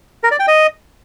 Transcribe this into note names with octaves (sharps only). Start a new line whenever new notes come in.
A#4
D5
G5
D#5